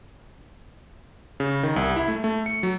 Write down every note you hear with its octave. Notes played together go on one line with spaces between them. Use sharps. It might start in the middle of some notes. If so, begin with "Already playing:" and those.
C#3
D#3
C2
E4
A3
A3
C#7
F#3